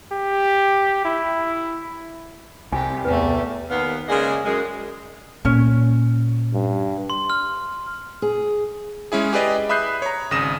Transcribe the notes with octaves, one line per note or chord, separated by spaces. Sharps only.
G4
E4
C2 G4 G#5
E2 A2 G3 A3 B4 G#5
D#2 B3 F5
C#3 G#3 A#3 G#4 D5 D#5
F#2 G#3
A#2 C#4 C#5
G2
C6
F6
G#4
G#3 C#4 E4 G#4
G4 G#4 B4 D5 D#5
E5 B5 D#6 F#6 G6 C7
C#5 A#5
G#1 C#3 D#6 A#6 E7